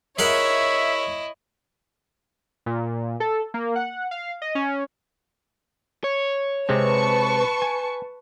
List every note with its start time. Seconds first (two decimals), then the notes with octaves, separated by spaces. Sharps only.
0.19 E4 G#4 A#4 C#5 D#5 E5 F#5
2.66 A#2
3.20 A4
3.54 A#3
3.76 F#5
4.11 F5
4.42 D#5
4.55 C#4
6.04 C#5
6.69 C3 G#3 C4 B4 A5 C#6
7.62 G#5